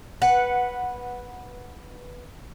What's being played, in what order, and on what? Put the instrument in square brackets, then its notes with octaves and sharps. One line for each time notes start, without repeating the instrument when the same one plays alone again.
[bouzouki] B4 F#5